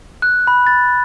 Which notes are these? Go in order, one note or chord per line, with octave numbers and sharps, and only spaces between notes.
F#6
B5
A6